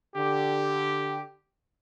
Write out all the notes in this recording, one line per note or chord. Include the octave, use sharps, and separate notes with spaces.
D3 G4